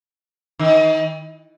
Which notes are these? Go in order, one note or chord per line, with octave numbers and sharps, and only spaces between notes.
D#3